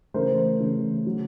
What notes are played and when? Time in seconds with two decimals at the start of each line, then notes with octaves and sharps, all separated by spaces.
0.14 C#3 E3 A3 C#4 A#4 C5
0.60 C#3 E3 A3 C#4
1.06 C#3 F#3